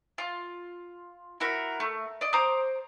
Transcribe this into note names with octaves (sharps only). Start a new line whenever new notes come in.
F4
E4 F#4 A#4 B5
A3
D5 D#5
C5 A#5 D6 D#6